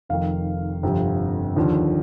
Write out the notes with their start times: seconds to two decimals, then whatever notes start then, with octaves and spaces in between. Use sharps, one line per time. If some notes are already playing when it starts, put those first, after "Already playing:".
0.09 F1 F2 D#3 F5
0.83 G1 F2 C3
1.56 D#2 D3 F3